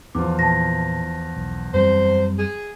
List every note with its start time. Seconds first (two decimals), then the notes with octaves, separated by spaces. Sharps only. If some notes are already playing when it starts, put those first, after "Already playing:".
0.15 E2 F3 D6
0.39 A#2 E3 A5 A#6
1.35 B1
1.74 F#2 G3 C4 C5
2.39 G#4